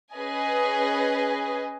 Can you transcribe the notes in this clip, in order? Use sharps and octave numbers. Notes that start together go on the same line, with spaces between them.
C#4 G#4 B4 D#5 G#5